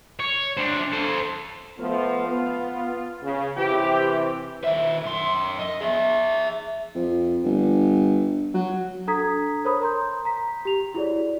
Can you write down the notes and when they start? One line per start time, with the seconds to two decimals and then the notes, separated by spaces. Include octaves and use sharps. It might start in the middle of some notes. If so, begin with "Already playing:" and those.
0.20 C#5
0.57 D4 C5
0.93 A4 C5
1.78 F3 A3 B3 F4
2.29 B3
3.23 C#3
3.57 C3 E3 G4
4.64 D#3 E5
5.05 F#2 C6
5.59 D#5
5.81 G#4 E5
6.95 F2
7.44 G1
8.54 F#3
9.07 D4 A4 A#5 D#6 G#6 B6
9.65 A#4 C5 C#5 B5 D#6
9.82 A#5 C6 G6
10.25 A#5 B6
10.65 G4 F7
10.94 E4 F#4 G#4 C#5 D5